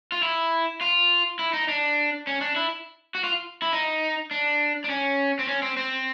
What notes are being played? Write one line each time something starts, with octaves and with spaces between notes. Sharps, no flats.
F4
E4
F4
E4
D#4
D4
C#4
D4
E4
F#4
F4
E4
D#4
D4
D4
C#4
C4
C#4
C4
C4